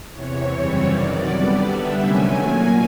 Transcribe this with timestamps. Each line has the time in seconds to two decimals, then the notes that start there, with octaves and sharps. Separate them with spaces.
0.12 E2 C3 E3 C#5
0.50 F#2 C#3 E3 G3 C4
0.87 C3 D#3 F#3 D5
1.25 D3 G3 B3
1.63 D3 G3 B3 D4 E5
2.01 C3 D#3 F#3 A3 C#4 G#5
2.38 A#2 F#3 A#3